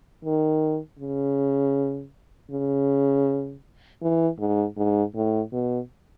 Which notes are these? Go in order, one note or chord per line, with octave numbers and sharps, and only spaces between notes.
D#3
C#3
C#3
E3
G#2
G#2
A2
B2